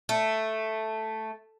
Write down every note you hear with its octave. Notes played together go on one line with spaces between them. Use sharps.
A3